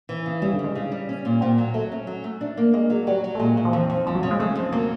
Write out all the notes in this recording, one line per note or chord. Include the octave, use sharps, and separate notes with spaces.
E3
C#3
C#3 G3
D3
G3
G#3
C#3
G3
C#4
A#2
A#2 C4
F#3
F#3 A3
C#4
F#3
A3
D4
A#3
G#3 A#3
F#3
F#3 G3
F#3
A3
A#2 G#3
A#2
F3
F2 E3
F2
C#3 F3
F#3
C#3
G#3
C#3 A3
F2
F#3 A#3